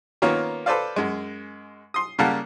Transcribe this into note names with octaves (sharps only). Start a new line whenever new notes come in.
D#3 A#3 B3 C#4 F4 C#5
A4 B4 C5 D5 F5
F#2 G#3
C6 D#6
C#3 G3 A#3 F5 F#5 A5